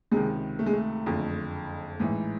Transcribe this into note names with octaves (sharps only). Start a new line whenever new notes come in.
C#2 C3 D#3 G#3
A3
G#3
A3
F#1 F2 D3
A1 G#2 E3